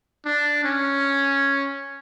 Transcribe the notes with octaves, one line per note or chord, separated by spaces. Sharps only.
D4
C#4